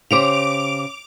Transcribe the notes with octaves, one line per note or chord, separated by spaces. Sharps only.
C#3 G4 C5 D6 D7 F7